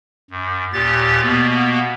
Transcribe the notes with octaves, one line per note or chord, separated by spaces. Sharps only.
F#2
D#2 A#2 G4 A6
B2 A#3 B3